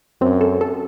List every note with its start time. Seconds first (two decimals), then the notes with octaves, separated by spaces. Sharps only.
0.21 F#2 C4
0.41 A4
0.61 A4